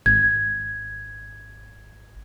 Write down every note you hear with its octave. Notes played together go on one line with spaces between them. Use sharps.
G#1 G#6